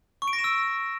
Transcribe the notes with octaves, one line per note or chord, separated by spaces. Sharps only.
C#6
D7
A#6
E7
E6